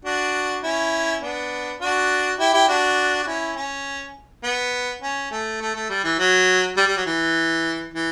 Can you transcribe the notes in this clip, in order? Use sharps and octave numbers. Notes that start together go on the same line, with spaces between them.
D4 F#4
C#4 E4
B3 D4
D4 F#4
E4 G4
E4 G4
D4 F#4
F#4
C#4 E4
C#4
B3
C#4
A3
A3
A3
G3
E3
F#3
G3
G3
F#3
E3
E3